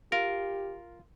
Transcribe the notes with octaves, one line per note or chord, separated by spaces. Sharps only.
F4 G4 A#4